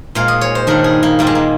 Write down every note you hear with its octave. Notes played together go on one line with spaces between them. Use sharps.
A#2 G#3 F5
D#5
C#5
C5
G2 D#3 G3 A#4
G#4
A#3
A#2 G3 A#3
G#3
A#3